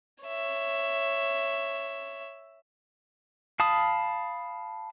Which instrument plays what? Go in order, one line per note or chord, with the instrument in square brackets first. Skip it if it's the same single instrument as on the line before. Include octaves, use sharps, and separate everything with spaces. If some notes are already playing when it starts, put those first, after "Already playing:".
[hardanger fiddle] C#5 E5
[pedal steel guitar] F5 A5 B5 D#6